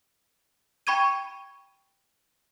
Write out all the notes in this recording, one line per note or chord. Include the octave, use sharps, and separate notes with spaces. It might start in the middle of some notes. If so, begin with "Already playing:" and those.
G5 B5 C#6 G#6 D#7